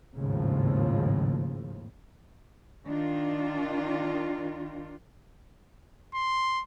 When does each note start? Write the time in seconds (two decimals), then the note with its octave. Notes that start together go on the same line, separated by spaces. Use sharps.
0.16 G#1 D#2 A2 C#3 F3
2.86 D#3 D4 F4
6.14 C6